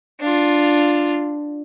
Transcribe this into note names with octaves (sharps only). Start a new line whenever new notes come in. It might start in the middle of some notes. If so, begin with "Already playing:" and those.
D4 F4